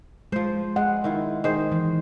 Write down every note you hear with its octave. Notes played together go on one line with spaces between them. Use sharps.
F3 G#3 C5
G#3 F#5
D#3 E4 F4
D#3 G#4 C5
E3